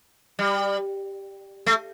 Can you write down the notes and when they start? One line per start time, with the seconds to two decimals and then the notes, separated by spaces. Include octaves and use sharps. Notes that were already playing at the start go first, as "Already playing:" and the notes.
0.39 G3
1.66 A3